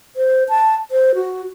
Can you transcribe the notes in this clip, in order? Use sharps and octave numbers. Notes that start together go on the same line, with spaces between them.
C5
A5
C5
F#4